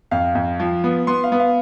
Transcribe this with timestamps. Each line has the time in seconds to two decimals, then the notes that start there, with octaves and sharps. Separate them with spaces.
0.11 F2 F5
0.35 F2
0.60 F3
0.84 B3
1.07 B3 C6
1.24 F5
1.32 B3
1.40 F5